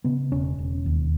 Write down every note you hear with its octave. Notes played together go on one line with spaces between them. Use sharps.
C#3 B3
E1 C#4
E1
D#2